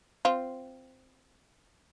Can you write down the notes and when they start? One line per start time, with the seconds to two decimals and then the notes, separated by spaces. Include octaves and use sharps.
0.25 C4 F4